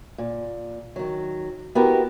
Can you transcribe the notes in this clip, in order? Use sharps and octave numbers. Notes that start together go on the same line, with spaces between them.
A#2
D#3 F#3
B3 E4 F#4 G4 A#4